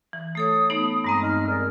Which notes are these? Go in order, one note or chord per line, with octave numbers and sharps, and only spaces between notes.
E3
A3 A4 C#5 D#6
A3 B3 D#4
G2 G#3 C4 A#5 C6 D#6
D#4 D#5 F6
G#4 A#4 D5